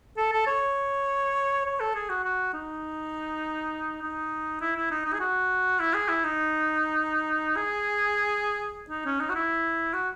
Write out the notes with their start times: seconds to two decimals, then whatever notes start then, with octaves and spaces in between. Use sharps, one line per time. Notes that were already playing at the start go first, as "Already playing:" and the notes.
0.17 A4
0.32 A4
0.47 C#5
1.66 C#5
1.80 A4
1.95 G#4
2.09 F#4
2.24 F#4
2.53 D#4
4.02 D#4
4.61 E4
4.76 E4
4.91 D#4
5.05 D#4
5.14 G#4
5.20 F#4
5.80 E4
5.94 G#4
6.09 E4
6.24 D#4
7.57 G#4
8.90 D#4
9.05 C#4
9.20 D#4
9.29 F#4
9.35 E4
9.94 F#4